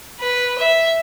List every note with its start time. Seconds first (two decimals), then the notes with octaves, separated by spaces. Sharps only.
0.19 B4
0.58 E5